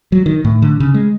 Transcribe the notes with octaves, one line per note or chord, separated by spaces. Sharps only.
F#3
D#3
A2
D3
C#3
G#3